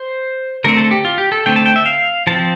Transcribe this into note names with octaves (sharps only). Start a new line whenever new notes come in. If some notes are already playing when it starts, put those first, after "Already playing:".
Already playing: C5
D3 A3 C4 A#4
A4
G4
F4
G4
A4
D3 A3 C4 G5
A5
G5
E5
F5
F3 C4 A5